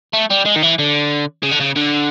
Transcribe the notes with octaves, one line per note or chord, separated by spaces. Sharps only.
A3
G3
G#3
D#3
E3
D3
C#3
D3
C#3
D3